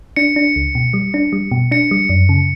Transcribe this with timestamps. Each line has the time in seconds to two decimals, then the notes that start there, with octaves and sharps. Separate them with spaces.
0.16 D4 C#7
0.36 D4
0.56 C#2
0.75 B2
0.94 G3
1.14 D4
1.33 G3
1.51 B2
1.71 D4 C#7
1.91 G3
2.09 F#2
2.29 C#3